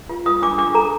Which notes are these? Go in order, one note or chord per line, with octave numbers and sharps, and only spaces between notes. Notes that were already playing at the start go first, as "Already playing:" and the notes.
F4
F4 D#6
D4 D6
D4 D6
A4 A#5